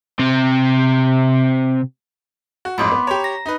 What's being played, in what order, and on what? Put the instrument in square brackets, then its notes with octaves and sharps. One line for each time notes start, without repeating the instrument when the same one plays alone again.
[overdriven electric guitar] C3 C4
[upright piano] F#4
[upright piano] A1 F2 G#2 [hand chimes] B5 C6 D6
[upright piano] B3
[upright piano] G4 C#5 [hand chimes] A#5
[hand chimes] A#6
[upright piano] D#4 B4